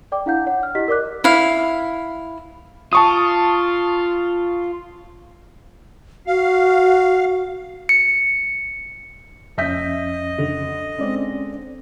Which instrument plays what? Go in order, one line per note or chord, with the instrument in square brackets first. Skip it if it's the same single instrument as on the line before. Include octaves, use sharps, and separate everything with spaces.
[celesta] D5 G5 D6
D4 E4 F5 F#5 G6
C#5 F#5
F6
E4 G4 D#5 B6
A#4 D5 D6 F#6
[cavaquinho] E4 F5
[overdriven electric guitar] F4 [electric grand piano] A5 C#6 D#6
[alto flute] F#4 [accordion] F5
[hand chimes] C#7
[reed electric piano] F2 C#4 [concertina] D#5 [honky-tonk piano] E5 G6 B6
[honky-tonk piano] D3
[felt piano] G#3 C4 [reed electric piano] C#4 D5